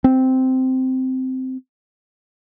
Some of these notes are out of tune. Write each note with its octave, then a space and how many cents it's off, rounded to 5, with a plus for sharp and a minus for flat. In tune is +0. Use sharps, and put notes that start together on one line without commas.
C4 -10